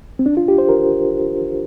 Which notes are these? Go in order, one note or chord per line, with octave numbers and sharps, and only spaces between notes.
C4
D4
F4
G4
C5
A#4